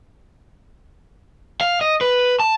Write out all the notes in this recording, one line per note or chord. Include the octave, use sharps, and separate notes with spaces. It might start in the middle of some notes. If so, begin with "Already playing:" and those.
F5
D#5
B4
A5